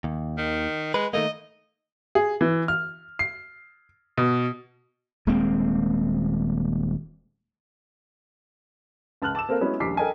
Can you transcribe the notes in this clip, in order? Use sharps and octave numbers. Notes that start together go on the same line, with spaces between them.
D#2
D#3
G#3 B4
D#3 A3 A#3 D#5
G#4
E3
F6
C7
B2
D#1 G#3 A#3 C4
C#2 A5 F6 F#6 F#7
A5 D6 E6 E7
A#3 C4 A4 A#4 F5
F#3 G#3 B3 C#4 E4
D#1 A#1 G3 D6 B6 C7
A4 A#4 D#5 G5 G#5